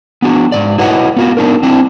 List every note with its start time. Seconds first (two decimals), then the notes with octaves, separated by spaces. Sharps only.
0.22 B3 D4 F#4
0.52 G#2 E3 D5
0.78 E4 F#4 B4 C#5 D#5 F#5
1.16 B3 F4 F#4
1.37 B3 D4 D#4 A#4
1.63 C4 D4 E4